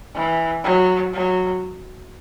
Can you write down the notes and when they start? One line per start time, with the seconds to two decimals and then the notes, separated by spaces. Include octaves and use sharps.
0.15 E3
0.64 F#3
1.14 F#3